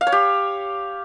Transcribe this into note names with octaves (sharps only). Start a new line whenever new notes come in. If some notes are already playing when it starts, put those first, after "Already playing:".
F5
C#5
G4